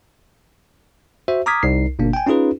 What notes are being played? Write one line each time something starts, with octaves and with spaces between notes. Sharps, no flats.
F#4 C5 E5
A#5 D6 D#6 F6 G#6 B6
C2 D#4 C7
G1 B2 A#3 D4
G5 G#5
C#4 D#4 F4 G#4 B4